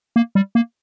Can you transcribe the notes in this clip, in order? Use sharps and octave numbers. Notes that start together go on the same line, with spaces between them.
A#3
G3
A#3